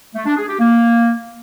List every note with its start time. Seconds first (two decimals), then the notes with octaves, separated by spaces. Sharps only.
0.15 A3
0.26 D4
0.37 G#4
0.48 G4
0.59 A#3